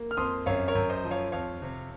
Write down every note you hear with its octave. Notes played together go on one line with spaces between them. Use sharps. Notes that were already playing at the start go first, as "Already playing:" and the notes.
Already playing: A#3
F6
F2 C6 D#6
F#2 C#5 F5
A#4 C#5
F#2
C5 D#5
F3
C#5 F5
F2 C#5 F5
C3